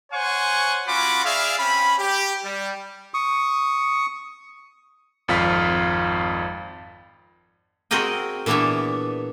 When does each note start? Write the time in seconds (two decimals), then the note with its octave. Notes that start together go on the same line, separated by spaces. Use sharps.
0.12 C5 C#5 F#5 G#5 C#6
0.87 C#4 F4 F#4 B5 D6
1.25 G#4 D5 E5 F5
1.58 C4 C#4 B5
1.99 G4
2.44 G3
3.14 C#6 D#6
5.28 G#1 F2 F4 B6
7.91 C4 F#4 G#4 A#4 D#5 G5
8.46 A#2 E3 B3 D4 C#5 E5